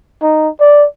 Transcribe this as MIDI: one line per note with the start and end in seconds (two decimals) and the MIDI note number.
0.22 0.49 63
0.60 0.86 74